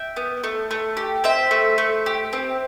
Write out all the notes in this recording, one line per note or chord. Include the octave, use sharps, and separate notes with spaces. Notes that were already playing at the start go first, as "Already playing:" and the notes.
Already playing: E5 G5
B3
A3
A3
G4
C4 C5 E5
A3
A3
G4
C4